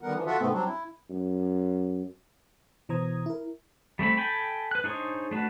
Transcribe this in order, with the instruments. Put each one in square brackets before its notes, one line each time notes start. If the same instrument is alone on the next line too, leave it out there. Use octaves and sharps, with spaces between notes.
[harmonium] D3 D#3 G3 B3 A#4 F#5
D3 E3 F3
F4 F#4 A4 E5 F#5
G#2 C3 A3 B3 C4
F#3 G3 C4 D4
E4
[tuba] F#2
[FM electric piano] B2 E3 C5 A#5 D#6 G#6
E4 A#4
[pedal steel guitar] G3 A3 C4 B5
A4 G5 G#5 B5
B4 F#6
D4 D#4 G#4 C5 C#5
A3 D4 F#4 B4